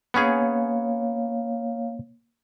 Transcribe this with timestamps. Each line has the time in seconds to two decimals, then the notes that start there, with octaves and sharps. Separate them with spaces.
0.14 A#3 B3 C#4 G#4 C#5 F5